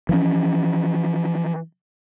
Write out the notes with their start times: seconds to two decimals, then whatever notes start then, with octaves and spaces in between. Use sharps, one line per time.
0.09 E3 F3 C#4